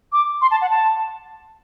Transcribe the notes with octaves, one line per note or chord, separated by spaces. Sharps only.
D6
C6
A5
F#5
A5